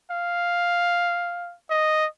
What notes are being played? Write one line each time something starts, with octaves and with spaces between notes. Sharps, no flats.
F5
D#5